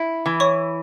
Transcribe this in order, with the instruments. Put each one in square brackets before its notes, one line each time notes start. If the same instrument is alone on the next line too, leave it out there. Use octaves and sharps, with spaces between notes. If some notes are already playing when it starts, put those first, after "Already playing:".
Already playing: [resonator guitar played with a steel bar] E4
E3
[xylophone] C#5 C#6